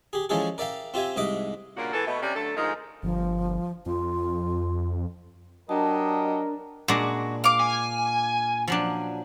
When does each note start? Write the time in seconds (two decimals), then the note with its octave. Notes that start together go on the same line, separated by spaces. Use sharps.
0.13 G4 G#4
0.29 E3 F3 G#3 C#4 G#4 A4
0.58 A#4 D5 E5 F5 G5
0.94 C4 F4 G4 E5 G#5
1.16 C2 G#2 D#5 E5 D6
1.76 G2 A#2 C#3 A#3 F#4
1.93 B2 E3 G#4 A4
2.06 B2 A3
2.21 C3 G3 C#4
2.35 D3 F#3 A3 A4
2.56 D2 G#2 F3 G#3 D#4 A#4
3.03 G1 F3
3.86 F2 F4
5.69 F#3 D4 G4 A#4 D#5 A5
6.88 A#2 G#3 D4 F#4
7.44 F5 D6
7.60 G#5
8.68 F3 F#3 D4